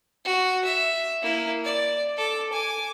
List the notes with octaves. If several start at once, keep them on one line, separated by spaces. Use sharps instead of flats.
F#4
E5
A#3 E4
D5
A4 D6
G#5 D6